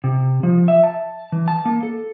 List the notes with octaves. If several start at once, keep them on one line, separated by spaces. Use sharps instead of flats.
C3
F3
E5
A5
E3
A5
A#3
A4